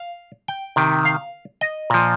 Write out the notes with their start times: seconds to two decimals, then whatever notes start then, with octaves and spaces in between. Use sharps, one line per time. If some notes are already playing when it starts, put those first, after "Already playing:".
Already playing: F5
0.48 G5
0.76 C3 D#3
1.05 F5
1.61 D#5
1.90 A#2 F3